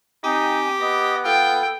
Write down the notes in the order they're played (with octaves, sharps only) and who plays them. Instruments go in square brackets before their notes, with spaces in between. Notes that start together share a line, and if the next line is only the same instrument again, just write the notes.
[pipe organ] C4 G#5 [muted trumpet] D#4 [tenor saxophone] G4
[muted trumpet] B3 [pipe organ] D#5 D#6
[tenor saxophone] F4 [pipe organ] A4 [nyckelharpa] G5